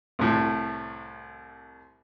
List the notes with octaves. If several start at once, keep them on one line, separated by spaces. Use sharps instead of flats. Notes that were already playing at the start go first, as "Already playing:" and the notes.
C2 A2